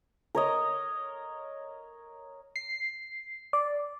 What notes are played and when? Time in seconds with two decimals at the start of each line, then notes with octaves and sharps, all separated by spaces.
0.35 A#4 C#5 D#5
2.56 C7
3.53 D5